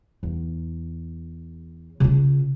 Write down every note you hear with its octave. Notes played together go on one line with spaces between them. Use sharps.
E2
C#3 F4